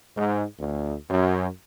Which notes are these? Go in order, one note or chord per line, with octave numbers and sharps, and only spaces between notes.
G#2
D2
F#2